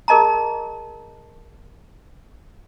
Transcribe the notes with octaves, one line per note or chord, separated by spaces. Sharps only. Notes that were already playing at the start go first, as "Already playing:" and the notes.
G#4 A#4 D#5 A5 A#5